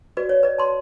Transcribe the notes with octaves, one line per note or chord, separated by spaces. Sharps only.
F#4 B4 D5
C#5
B4 D5
A5 C6